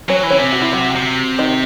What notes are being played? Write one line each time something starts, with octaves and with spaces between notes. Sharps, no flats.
F#3 C#4 C#5
E3
C#4 C#5
C3
F#4
E4
F#3 F#4
C3
D#3 D#4